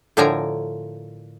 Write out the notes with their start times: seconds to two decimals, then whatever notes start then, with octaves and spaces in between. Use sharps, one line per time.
0.17 A2 D3 F3 A#4 G#5 A#5